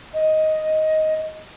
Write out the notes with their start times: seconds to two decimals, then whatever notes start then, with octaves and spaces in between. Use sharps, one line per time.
0.14 D#5